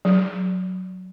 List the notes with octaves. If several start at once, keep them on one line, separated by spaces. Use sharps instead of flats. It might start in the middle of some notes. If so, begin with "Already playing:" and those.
F#3